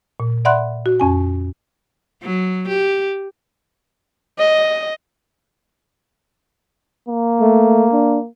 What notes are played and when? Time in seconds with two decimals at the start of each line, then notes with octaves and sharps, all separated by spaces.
0.20 A#2
0.45 D5 E5 F#5 B5 C6 F#6
0.86 F#4
1.00 F2 C#4 G#5
2.22 F#3
2.68 G4
4.39 D#5
7.09 A#3
7.41 A3
7.92 D4